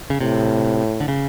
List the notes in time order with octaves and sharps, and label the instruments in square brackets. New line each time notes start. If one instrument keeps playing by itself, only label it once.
[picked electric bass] C#3
[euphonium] A2 [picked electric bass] C3
[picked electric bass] D3
C#3